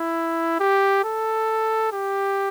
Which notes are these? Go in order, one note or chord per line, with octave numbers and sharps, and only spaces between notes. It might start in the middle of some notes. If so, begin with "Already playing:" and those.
Already playing: E4
G4
A4
G4